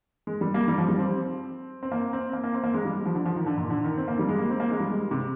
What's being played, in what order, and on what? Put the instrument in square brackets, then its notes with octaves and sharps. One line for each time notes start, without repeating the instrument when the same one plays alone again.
[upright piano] G#3
G3
A#3
G3
F3
G3
C4
C4
A#3
C4
A#3
A#3
C4
A#3
G#3
G3
F3
D3
F3
D#3
D3
A#2
D3
D#3
C4
A#3
G3
G#3
A#3
C4
A#3
G#3
G3
G#3
C3